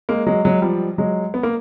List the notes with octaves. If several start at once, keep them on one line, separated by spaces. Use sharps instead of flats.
G#3 A#3
F#3 G#3
F#3 G#3
F3 G3
F#3 G#3
B3
A#3